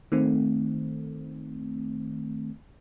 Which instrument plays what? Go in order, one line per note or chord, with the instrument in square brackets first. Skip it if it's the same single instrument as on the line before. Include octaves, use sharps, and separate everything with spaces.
[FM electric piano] D#3 A3 C4